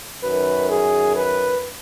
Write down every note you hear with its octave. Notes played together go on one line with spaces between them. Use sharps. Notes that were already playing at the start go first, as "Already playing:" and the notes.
F#2 D#3 B4
G#4
B4